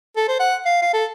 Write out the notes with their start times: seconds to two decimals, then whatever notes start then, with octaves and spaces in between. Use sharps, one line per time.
0.17 A4
0.28 C5
0.40 F#5
0.65 F5
0.82 F5
0.93 A4